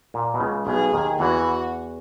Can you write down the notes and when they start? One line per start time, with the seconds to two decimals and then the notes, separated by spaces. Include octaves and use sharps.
0.14 A#2
0.34 B2
0.40 C#2 C#3
0.67 B1 B2 G#4
0.93 D#2 D#3
1.20 E2 E3 F#4